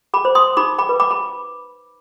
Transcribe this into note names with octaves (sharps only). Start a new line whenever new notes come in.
B5 D6
C5
C6 D#6
D#4 B5 D6
B5 D6
B4
B5 D6
B5